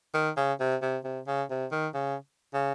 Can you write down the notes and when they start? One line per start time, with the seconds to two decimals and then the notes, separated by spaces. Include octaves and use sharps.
0.14 D#3
0.37 C#3
0.60 C3
0.82 C3
1.04 C3
1.27 C#3
1.50 C3
1.72 D#3
1.94 C#3
2.54 C#3